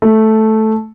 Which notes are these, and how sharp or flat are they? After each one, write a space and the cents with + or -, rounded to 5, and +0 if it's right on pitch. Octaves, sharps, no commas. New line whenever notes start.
A3 -5